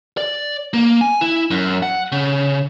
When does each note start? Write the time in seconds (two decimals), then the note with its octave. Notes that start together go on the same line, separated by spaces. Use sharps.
0.17 D5
0.73 A#3
1.01 G#5
1.21 E4
1.51 F#2
1.83 F#5
2.12 C#3